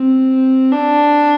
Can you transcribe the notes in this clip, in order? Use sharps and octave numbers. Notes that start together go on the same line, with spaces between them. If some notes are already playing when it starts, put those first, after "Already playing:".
Already playing: C4
D4